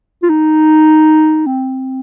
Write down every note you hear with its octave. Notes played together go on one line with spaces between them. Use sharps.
F4
D#4
C4